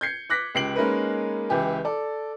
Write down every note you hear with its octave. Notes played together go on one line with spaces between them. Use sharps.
G6 G#6 C7 C#7
D6 F#6 A#6 B6
C#2 G4 C7 D7 F#7
G#3 A#3 C#4 D#4 A#4 B4
C#2 E3 E4 G4 G#5
A4 D5